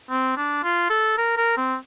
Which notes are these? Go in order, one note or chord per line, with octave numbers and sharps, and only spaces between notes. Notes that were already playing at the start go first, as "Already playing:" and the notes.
C4
D4
F4
A4
A#4
A#4
C4